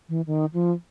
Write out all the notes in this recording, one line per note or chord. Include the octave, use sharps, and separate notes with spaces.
E3
D#3
F3